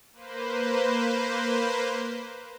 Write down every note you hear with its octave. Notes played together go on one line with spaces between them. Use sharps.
A#3 B4 C5